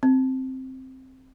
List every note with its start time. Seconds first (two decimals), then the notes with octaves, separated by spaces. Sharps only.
0.03 C4